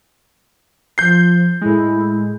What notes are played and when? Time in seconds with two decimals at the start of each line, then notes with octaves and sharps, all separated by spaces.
0.98 F3 G6 C7
1.61 A2 G#3 E4